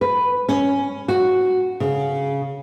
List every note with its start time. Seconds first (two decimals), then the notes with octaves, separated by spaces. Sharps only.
0.01 B4
0.49 C#4
1.08 F#4
1.80 C#3